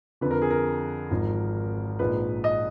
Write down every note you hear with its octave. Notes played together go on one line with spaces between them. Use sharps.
F2 D3 F3 B4
A#4
G#4
A#4
G#1 G#2 F3
A#1 G#2 F3 B4
D#5